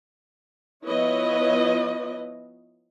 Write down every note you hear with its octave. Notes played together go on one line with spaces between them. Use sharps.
F3 B3 E4 B4 C#5 D#5